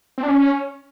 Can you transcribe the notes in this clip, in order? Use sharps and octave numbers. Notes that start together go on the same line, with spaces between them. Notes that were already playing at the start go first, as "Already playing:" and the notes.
C4
D4
C#4